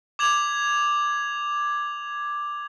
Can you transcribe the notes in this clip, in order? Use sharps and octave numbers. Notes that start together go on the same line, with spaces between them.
D6 G#6 F7 F#7